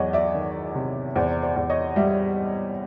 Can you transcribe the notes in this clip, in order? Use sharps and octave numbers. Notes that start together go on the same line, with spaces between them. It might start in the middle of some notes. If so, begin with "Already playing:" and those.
Already playing: E2 F#3 C#5 D#5 F#5
D5 E5
D#3
C3
E2 C5 D5
C5 D5
E2
C#5 D#5
G3 D5 E5